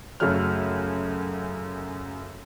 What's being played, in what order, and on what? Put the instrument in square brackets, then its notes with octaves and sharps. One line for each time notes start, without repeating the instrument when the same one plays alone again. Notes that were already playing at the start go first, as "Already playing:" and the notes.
[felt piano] F#2 C#3 F#3 A3 C#5 F6